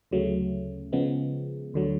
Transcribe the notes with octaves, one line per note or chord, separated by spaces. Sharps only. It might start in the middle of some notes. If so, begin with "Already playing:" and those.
D2 C#3 F#3 A3
C#3 F3 G#3 B3
D2 D3 F#3